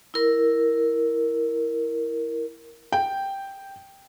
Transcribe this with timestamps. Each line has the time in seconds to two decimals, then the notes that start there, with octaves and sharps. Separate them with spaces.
0.14 E4 A#4
2.92 G5